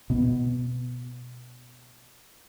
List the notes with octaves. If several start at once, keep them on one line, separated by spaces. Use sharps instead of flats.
B2 B3